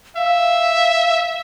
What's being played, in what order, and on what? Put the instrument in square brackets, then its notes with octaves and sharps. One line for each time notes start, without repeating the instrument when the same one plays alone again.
[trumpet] E5 [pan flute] F5